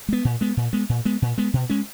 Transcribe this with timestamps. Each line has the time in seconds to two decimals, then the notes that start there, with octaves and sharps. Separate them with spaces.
0.08 G#3 B3
0.25 A#2
0.41 G#3 B3
0.57 A#2
0.73 G#3 B3
0.89 A#2
1.05 G#3 B3
1.22 A#2
1.38 G#3 B3
1.53 B2
1.69 G#3 C#4